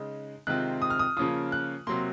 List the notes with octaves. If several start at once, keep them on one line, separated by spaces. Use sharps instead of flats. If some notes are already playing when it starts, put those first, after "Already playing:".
Already playing: C#3 G#3 D#4
C3 D#3 G#3 C4 F4 F#6
D#6
F6
D#6
C#3 F3 A#3 C#4 F4 D#6
F#6
C3 F#3 A#3 C6